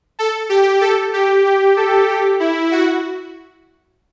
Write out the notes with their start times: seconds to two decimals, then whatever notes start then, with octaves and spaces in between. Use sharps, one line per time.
0.19 A4
0.49 G4
0.81 A4
1.13 G4
1.46 G4
1.77 A4
2.09 G4
2.40 E4
2.72 F#4